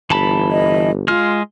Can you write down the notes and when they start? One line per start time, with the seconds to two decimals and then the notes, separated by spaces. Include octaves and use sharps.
0.10 G1 E3 A5 B5
0.51 D#5
1.08 G#3 F4 F6